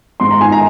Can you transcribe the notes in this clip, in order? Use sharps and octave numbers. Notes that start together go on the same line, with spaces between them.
G#2 C6
A#5
D#3 G#5
A#5